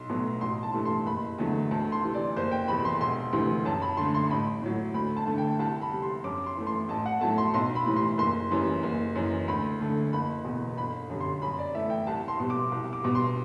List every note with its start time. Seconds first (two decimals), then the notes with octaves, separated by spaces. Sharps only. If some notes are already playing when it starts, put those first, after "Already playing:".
Already playing: B1 C6
0.09 B2 F#3 A3
0.41 A1 C6
0.63 A5
0.73 G2 E3 A3
0.85 C6
1.06 F#1 B5
1.38 E2 D3 F#3 A3
1.71 D2 A5
1.92 C6
2.04 C3 E3
2.14 D5
2.36 F#1 C5
2.51 G5
2.68 E2 C3 E3 B5
2.85 C6
3.01 E1 C6
3.33 D2 C3 E3 G3
3.65 F#2 A5
3.82 B5
3.97 D3 A3 C6
4.14 C6
4.30 A1 B5
4.62 A2 F#3
4.94 D2 B5
5.16 A5
5.26 D3 A3
5.38 G5
5.59 C2 A5
5.82 B5
5.92 C3 G3
6.02 C6
6.24 F#2 D6
6.46 C6
6.57 E3 A3
6.67 C6
6.89 A1 A5
7.06 F#5
7.21 A2 F#3 A3 A5
7.38 C6
7.54 B1 C6
7.75 B5
7.86 A2 E3 G3
7.96 C6
8.18 F#1 C6
8.50 F#2 E3 G3
8.83 F#1
9.15 F#2 E3
9.48 D2 B5
9.80 D3 A3
10.13 F#1 B5
10.45 E2 B2
10.78 G1 B5
11.10 F#2 D3 G3
11.21 C6
11.42 F#2 B5
11.59 D5
11.74 E3 A3 E5
11.90 G5
12.07 C2 A5
12.28 C6
12.39 B2 G3
12.50 D6
12.72 C2
12.93 D6
13.03 B2 G3
13.15 C6